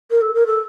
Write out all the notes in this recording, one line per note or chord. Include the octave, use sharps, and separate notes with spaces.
A#4
A4
A#4
A4